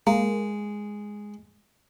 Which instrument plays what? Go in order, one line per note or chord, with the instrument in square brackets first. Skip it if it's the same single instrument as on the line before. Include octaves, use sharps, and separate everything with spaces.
[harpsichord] G#3 [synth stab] A#3